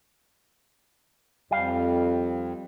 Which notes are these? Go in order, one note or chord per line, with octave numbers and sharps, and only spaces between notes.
F2 G3 F5